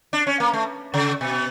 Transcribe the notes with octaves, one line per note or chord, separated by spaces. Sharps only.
D4
C#4
A#3
A3
C#3
B2